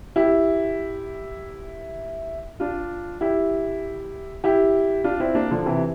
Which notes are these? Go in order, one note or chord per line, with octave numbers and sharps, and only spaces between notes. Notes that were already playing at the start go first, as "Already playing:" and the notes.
E4 G4
D4 F4
E4 G4
E4 G4
D4 F4
C4 E4
A#3 D4
D3 F3
C3 E3